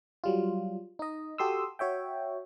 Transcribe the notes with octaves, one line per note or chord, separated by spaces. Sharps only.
F#3 G3 F4
D#4 D#5
F#4 G4 A4 C6 D#6 E6
F#4 C#5 E5 G5